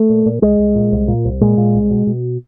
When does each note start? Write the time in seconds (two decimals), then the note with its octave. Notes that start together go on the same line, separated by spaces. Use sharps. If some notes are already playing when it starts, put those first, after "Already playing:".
Already playing: A3
0.09 A#2
0.26 A#2
0.42 C2 G#3
0.59 C2
0.75 A#2
0.92 C2
1.08 A#2
1.25 C2
1.41 A#2 G#3
1.57 A#2
1.74 C2
1.90 B2
2.07 B2